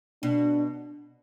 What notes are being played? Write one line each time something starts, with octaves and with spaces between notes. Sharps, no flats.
B2 D4